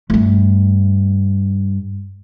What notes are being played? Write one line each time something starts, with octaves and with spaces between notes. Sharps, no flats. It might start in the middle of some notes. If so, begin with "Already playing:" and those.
G2 A3